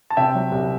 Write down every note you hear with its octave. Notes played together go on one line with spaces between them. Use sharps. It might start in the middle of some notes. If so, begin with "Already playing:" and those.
A5
C3 E5 G5
F#3
C2